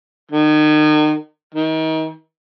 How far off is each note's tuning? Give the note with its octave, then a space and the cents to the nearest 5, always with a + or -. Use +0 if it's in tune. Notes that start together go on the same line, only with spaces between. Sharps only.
D#3 -35
D#3 +35